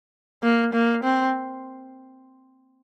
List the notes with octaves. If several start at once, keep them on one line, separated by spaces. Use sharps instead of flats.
A#3
A#3
C4